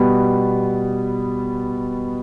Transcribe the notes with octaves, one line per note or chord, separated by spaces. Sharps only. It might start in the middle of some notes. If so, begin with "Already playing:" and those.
Already playing: B2 G3 B3